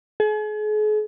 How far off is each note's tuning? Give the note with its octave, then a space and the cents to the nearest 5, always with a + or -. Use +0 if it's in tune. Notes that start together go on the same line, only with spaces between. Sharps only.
G#4 +40